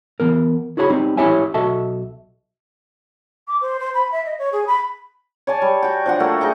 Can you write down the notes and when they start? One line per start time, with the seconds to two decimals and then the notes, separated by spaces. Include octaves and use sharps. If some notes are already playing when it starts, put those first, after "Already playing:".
0.20 E3 B3 A#4
0.77 E4 F#4 G#4 C#5 A#5 B5
0.90 G3 C4 D#4
1.17 C#4 E4 G4 C#5 E5 G#5
1.54 B1 F#4 A4 D#5 E5 A5
3.48 D6
3.61 C5
3.79 C5
3.94 B5
4.12 E5
4.25 D#5
4.39 C#5
4.52 G#4
4.67 B5
5.47 C#5 D5 G#5 A5
5.62 G3
5.83 F#4 G5
6.06 F3 D4 F#5
6.20 A3 A#3 F#4
6.40 D#4 G#4 D#5 G5